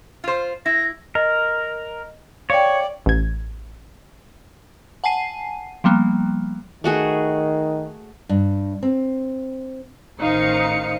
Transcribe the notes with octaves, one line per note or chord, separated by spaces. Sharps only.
F4 C5
E4 A#6
A#4 D#5
C#5 D5 F5 G5
A1 G#6
F#5 G#5 A5 C7 D#7
F3 G3 A#3 B3
D#3 A3 F#4 G#4
G2
C4
A1 D#3 D#4 C5 F5 C#7